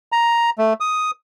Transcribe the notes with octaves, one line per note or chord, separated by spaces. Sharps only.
A#5
A3
D#6